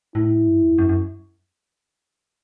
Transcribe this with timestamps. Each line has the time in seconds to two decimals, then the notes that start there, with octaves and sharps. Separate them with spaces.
0.15 A2 E4
0.47 G2
0.63 E2
0.78 F#2
0.89 F#2